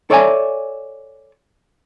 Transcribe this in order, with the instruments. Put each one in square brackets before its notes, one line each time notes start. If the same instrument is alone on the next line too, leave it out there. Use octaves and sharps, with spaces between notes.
[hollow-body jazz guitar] A4 C#5 D5 E5 F#5 G#5